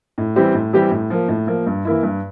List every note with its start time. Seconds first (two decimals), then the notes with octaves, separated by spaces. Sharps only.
0.18 A2
0.36 E3 G3 C4 G4
0.54 A2
0.73 E3 G3 C4 G4
0.91 A2
1.10 F3 A#3
1.28 A2
1.47 F3 A#3
1.67 G2
1.85 E3 A#3 E4
2.03 G2